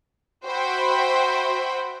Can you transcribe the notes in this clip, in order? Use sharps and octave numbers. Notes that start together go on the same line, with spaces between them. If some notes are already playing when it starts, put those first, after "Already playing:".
F#4 C5 E5 G5 B5